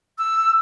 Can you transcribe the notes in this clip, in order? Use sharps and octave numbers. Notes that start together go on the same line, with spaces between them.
E6